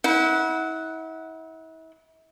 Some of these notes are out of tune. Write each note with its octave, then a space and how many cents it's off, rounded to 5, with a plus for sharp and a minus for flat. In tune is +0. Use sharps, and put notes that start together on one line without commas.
E4 -40 F#5 +0